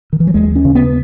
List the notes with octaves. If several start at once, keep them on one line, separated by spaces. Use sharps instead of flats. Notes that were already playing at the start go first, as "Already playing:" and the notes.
D#3
E3
F#3
D#2 G#3
C#4
C#3
B3